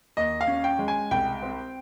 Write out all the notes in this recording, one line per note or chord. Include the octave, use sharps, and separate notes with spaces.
D#2 D#5
F5
C#4
G5
G#3
G#5
C2 G5
C4